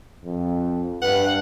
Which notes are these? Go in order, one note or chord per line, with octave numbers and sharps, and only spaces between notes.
F2
G2 B4 F#5